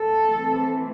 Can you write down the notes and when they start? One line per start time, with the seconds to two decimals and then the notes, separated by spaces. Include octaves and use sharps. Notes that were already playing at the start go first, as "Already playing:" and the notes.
Already playing: A4
0.24 E3 A3 C4